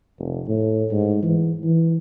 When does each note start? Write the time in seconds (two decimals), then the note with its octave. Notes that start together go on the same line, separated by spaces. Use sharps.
0.19 F1
0.48 A2
0.91 G#2
1.23 E3
1.64 E3